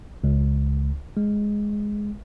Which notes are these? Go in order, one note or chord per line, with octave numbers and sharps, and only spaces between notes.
C#2
G#3